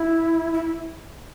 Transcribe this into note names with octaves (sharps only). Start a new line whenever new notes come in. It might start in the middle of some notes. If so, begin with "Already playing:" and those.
Already playing: E4
E4